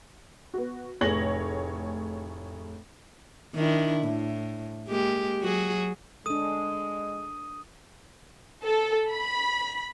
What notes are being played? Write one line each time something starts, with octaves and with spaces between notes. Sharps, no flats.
B3 F#4
F1 A2 G#4 C#5 A#6 F#7
D#3 D4 E4
A2
G#3 A#3 G4
F#3 F#4 G#4
G#3 D4 A4 D#6 D#7
A4
B5